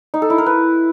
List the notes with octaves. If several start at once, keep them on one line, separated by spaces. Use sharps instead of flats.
D#4
A4
E4
A#4
B4